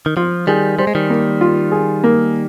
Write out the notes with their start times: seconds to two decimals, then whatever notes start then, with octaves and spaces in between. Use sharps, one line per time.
0.06 D#3
0.17 F3 F4
0.47 D#3 G3 G#4
0.79 G3 C5
0.87 G#3
0.95 D#3 G3
1.10 A#3
1.41 F4
1.72 G#4
2.04 A#3